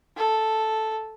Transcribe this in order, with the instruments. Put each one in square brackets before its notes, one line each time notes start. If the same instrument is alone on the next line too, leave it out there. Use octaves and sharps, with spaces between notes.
[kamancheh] A4